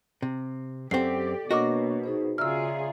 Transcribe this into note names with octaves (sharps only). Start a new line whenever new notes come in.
C3
F#2 C4 G4 A4 D5 C7
B2 A#3 D4 F#4 A#4 C#5 D#5 D6
D#4 G#4 C5
C#3 F4 G#4 D5 E5 A#5 E6 F6